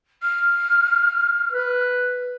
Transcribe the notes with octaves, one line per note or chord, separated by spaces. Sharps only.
F6
B4